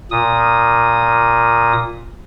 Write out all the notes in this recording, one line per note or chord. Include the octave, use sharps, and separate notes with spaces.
A#2 D#6